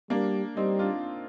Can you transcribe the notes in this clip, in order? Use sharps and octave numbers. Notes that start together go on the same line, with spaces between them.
G3 A#3 D4
G3 C4 D#4
D4 F4